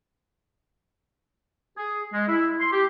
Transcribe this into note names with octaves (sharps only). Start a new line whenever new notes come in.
G#4
G#3
E4
C6
G4